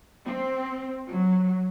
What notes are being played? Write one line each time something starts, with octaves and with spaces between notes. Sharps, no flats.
C4
F#3